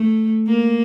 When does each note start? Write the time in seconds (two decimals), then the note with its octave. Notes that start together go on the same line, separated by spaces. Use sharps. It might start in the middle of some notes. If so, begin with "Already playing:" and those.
Already playing: A3
0.47 A#3